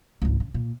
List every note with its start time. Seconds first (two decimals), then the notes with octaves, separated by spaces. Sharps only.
0.22 G#1 C#2
0.40 C#3
0.54 A#2